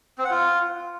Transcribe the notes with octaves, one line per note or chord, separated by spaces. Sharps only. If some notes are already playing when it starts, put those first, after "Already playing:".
C4
F#5
F4